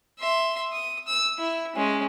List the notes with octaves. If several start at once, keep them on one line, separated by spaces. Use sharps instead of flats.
E5 C6
D#6
E6
E4
G#3 C#4